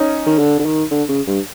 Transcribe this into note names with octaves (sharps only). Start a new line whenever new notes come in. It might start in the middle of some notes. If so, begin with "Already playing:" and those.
Already playing: C#4 D#4
D#3
D3
D3
D#3
D3
C#3
G2